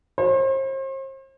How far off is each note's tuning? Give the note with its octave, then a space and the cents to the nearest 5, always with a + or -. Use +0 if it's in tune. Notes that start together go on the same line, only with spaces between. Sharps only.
C5 +40